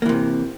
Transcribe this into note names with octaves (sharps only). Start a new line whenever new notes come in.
C3 E3 A#3